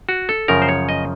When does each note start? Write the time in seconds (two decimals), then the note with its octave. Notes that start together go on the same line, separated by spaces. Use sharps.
0.09 F#4
0.29 A4
0.48 F#2 C#3 F3 A#4
0.62 C5
0.69 C#5
0.89 D#5